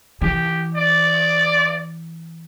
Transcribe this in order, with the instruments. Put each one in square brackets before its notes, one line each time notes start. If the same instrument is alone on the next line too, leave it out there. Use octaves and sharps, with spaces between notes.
[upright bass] E3 [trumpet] G4
[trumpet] D5